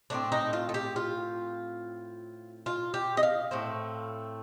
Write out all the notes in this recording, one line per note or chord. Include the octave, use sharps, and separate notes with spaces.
A2 A3 C4 D4
D#4
F4
A4
G4
F4
F4
G4
D#5
F5
A2 A3 C4